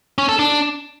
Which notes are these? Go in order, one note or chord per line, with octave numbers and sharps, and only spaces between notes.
C#4
A4
D4